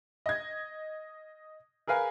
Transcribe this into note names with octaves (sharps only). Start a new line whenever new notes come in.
D#5 G#6
G#4 A#4 B4 F5 G#5